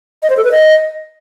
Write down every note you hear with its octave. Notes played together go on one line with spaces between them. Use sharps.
D#5
C5
A4
B4
D#5